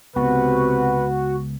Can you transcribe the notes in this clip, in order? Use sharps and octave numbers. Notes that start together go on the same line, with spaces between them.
C#2 C3 B3 F#4 B4